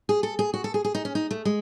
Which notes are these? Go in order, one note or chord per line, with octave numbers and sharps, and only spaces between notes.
G#4
A4
G#4
F#4
A4
G#4
G#4
D#4
C#4
D#4
A3
G#3